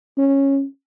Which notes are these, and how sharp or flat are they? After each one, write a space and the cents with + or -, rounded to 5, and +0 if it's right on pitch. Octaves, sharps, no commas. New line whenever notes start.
C#4 -10